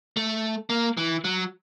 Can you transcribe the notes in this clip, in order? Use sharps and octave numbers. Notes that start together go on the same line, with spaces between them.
A3
A#3
E3
F#3